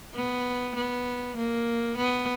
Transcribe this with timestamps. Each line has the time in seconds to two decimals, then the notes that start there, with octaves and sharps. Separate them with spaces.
0.15 B3
0.75 B3
1.36 A#3
1.97 B3